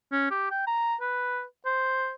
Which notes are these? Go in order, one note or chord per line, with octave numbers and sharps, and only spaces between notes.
C#4
G4
G5
A#5
B4
C5